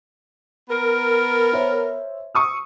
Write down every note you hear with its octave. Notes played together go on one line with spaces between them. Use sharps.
B3 A#4
C5 C#5 E5
C#6 D#6 E6